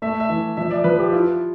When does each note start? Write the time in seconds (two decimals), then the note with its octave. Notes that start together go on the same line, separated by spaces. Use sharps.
0.02 A3 E5
0.20 E5
0.30 E3
0.57 F3 E5
0.71 D5
0.84 F3 B4
0.99 G4
1.12 E4 F4